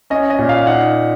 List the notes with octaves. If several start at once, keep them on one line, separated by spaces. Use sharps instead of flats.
C#4 D#5
D#5
A#2
F5
D#4 F#5